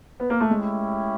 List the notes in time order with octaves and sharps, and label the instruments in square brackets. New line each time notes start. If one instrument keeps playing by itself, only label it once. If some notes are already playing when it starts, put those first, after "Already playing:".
[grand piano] B3
A#3
A3
[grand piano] G#3 [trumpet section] C#4 E4 G4